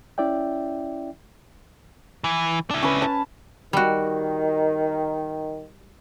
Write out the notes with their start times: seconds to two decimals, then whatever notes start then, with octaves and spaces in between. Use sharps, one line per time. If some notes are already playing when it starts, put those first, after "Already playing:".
0.18 C#4 E4 D5 E5 G5
2.24 E3
2.70 D4 E4
2.83 C#4 B4
3.02 A5
3.73 D#3 G3 F#4